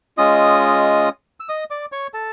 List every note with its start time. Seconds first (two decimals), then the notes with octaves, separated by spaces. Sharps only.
0.17 G#3 C#4 F4 D#5 D#6
1.40 E6
1.49 D#5 D#6
1.70 D5 D6
1.92 C#5 C#6
2.14 A4 A5